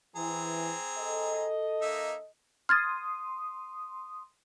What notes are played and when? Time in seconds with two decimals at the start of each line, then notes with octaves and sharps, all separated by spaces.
0.16 E3 C4 G#4 A#5
0.98 A4 D#5
1.82 A#3 D#4 E5
2.69 C6 D#6 F6 G#6 A6